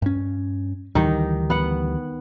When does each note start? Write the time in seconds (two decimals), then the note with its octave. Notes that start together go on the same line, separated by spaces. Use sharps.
0.02 G2 C#4
0.95 D2 D#3 E3 G3 D#4
1.50 B3 F#5